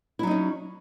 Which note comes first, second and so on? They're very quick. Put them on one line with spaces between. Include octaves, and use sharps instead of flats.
E4 F#3 D#4 C#4